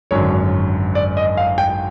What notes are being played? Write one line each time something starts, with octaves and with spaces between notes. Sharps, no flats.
G#1 F#2 D3 C#5
D5
D#5
F5
G5